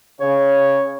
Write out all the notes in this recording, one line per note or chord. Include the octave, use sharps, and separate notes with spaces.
C#3 C#5